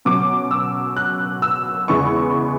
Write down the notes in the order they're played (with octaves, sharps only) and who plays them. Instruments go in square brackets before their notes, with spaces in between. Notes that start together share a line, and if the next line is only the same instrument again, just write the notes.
[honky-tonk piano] B2 F#3 C#4 D6
E6
F#6
E6
E2 C#3 E3 G#3 B3 C#6